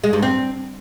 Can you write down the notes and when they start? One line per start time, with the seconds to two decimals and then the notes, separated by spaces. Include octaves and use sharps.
0.04 G#3
0.13 G2
0.23 C4